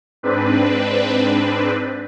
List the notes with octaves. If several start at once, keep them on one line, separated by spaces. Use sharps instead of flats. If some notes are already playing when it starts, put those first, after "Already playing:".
G#2 C4 D4 B4